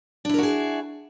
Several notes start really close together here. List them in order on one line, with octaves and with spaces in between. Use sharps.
D4 E4 A#4 F#4 G#4